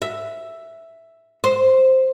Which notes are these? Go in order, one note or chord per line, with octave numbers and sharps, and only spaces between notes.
E5
C5